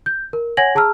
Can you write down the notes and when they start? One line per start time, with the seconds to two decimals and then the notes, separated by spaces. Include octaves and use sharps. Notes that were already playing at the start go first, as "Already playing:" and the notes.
0.06 G6
0.33 A#4
0.57 C#5 F#5 G#5 G#6 A#6 F#7
0.75 G#4 A5 A#5 E6 F6